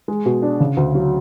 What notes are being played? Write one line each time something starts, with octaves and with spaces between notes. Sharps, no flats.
G#3
B2
D4
C#3
D2
F#3